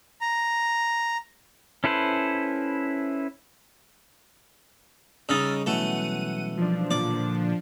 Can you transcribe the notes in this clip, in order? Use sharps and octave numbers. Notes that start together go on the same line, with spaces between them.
A#5
C#4 E4 A4 B4 C5
C#3 G3 C#4 D#4 D#5 E6 F6 A6
B2 E3 F#3 A3 F#5 D#7
F3 D4
A#2 D3 A#3 D5